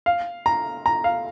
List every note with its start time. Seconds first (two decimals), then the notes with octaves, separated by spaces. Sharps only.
0.06 F5
0.46 A#5
0.86 A#5
1.04 F5